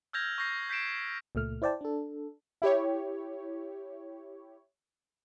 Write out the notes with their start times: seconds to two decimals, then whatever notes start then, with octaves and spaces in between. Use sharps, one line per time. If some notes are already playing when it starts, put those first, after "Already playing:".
0.13 E6 F6 G6 G#6 A#6 F7
0.38 C#6 G6 A#6 C7
0.69 G6 B6 C7 D7 E7
1.35 C#2 A#2 A3 F6
1.62 E4 C5 D5 G5 A5
1.81 D4 A4
2.62 E4 G4 C#5